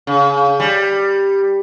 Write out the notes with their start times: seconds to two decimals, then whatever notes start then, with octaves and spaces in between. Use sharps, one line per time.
0.07 C#3
0.60 G3